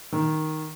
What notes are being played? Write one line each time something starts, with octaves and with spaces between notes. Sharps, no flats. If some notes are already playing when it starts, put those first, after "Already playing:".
D#3